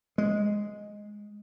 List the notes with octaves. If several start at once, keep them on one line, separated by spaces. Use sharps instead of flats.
G#3